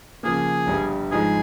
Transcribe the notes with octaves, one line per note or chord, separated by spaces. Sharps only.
C#3 F3 A#3 G#4
G1 G2 G3
G#2 F3 G#3 G#4